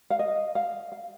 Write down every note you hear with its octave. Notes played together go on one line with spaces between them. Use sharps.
F5
D#5
F5
F5